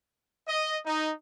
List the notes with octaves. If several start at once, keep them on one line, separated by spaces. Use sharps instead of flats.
D#5
D#4